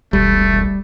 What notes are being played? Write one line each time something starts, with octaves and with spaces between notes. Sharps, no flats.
E1 C2 G3 A3